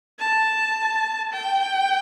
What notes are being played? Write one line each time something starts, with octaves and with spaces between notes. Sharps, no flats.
A5
G5